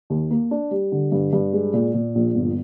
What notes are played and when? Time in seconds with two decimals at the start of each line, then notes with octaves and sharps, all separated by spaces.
0.10 D#2
0.31 A#3
0.51 D4
0.71 G3
0.92 D3
1.12 G2
1.33 G2
1.53 G#3
1.73 A#2
1.94 A#2
2.15 A#1
2.35 G1